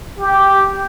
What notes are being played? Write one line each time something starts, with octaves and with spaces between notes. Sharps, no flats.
G4